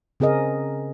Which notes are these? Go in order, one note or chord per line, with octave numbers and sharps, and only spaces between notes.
C#3 C4 G#4 A#4 D#5